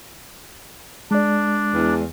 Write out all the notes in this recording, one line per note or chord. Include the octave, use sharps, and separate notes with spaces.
G#3 D4 D5
E2